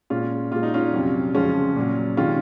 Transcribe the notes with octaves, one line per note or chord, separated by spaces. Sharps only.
A#2 G#3 C#4 F4
A#2 G#3 F4
D#4
C#4 F4
F2 C3 F#3
F2 C#3 F3 G#3 C#4 F4
A#2 F#3
C3 D#3 G#3 C#4 F4